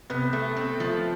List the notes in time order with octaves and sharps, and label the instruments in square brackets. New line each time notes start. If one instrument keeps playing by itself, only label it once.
[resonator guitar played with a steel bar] C3 [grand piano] B3
[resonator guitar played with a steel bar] A3
C4
F3